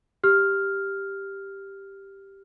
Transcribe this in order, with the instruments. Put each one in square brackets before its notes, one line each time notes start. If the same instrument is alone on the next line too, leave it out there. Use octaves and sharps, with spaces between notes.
[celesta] G4 F6